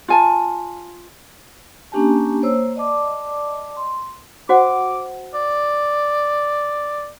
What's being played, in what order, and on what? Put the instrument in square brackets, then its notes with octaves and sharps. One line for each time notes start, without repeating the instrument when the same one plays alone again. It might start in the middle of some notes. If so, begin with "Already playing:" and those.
[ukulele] F4 G#5 A5
[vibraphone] A#3 C#4 D4 G4 G#5 A5
A#3 C5 C#5 E6
D5 D#5 A5 D6
C6
[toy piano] F#4 C5 F#5 [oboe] D6
[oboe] D5